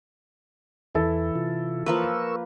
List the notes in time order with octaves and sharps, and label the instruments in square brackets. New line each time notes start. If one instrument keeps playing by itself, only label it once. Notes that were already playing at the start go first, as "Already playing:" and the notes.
[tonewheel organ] E2 [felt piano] E3 E4 A4
[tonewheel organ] C3 F4
[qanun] F3 A#3 B4 [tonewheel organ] A#4 C#6 E6